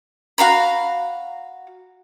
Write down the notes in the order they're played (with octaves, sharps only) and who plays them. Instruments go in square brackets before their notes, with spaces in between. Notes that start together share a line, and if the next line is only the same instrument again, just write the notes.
[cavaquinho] F#4 F5 A#5 B5